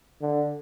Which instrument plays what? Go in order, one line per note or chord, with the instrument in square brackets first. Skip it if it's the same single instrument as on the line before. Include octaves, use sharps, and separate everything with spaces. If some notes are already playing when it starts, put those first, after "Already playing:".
[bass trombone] D3